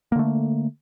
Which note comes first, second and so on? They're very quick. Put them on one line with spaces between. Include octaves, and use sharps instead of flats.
A#3 D3 A3